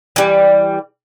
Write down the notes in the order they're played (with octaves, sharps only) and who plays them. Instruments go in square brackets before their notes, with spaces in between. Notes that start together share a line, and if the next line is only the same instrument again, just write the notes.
[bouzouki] E3 G3